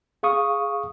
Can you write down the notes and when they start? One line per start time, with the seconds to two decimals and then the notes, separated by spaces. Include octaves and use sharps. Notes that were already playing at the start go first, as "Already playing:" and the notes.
0.23 G#4 F5 C#6 D#6